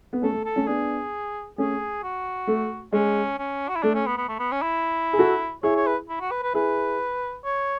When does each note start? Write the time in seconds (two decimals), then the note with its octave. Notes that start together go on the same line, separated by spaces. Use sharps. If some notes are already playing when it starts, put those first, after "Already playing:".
0.13 B3
0.22 A3 C#4 A4
0.33 A3
0.45 A4
0.56 A3 C#4
0.67 B3 D4 G#4
1.58 A3 C#4 G#4
2.03 F#4
2.47 A3
2.92 G#3 C#4
3.38 C#4
3.68 F#4
3.75 E4
3.83 A3 D4
3.94 C#4
4.06 B3
4.17 B3
4.29 A3
4.39 B3
4.52 C#4
4.62 E4
5.13 G#4
5.18 F#4 A4
5.63 E4 G#4 C#5
5.76 C#5
5.87 B4
6.09 E4
6.20 F#4
6.31 B4
6.43 B4
6.53 E4 G#4 B4
7.44 C#5